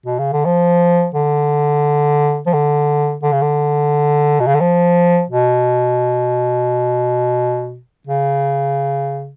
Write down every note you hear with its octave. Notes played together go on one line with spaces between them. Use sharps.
B2
C#3
D3
F3
D3
F3
D3
D3
C#3
D3
B2
C#3
D3
F3
B2
C#3